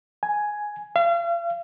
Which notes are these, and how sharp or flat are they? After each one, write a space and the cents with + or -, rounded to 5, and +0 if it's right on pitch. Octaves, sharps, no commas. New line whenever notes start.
G#5 +5
F5 -40